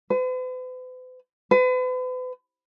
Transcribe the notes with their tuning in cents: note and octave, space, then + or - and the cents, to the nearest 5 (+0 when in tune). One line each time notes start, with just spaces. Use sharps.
B4 +45
B4 +40